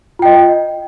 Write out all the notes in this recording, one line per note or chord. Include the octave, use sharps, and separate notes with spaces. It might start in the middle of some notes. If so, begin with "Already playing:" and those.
F4 D#5 G5